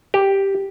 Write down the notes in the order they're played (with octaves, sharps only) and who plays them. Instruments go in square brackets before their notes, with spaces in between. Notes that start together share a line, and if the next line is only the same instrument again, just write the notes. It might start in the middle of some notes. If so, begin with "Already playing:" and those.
[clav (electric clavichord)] G4